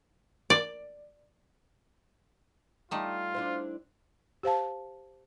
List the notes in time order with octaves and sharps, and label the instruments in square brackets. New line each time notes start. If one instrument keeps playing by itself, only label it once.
[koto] D5
[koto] G3 A3 D#4 [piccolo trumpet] F4
[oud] D4 E4 C5
[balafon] G4 C5 F5 A5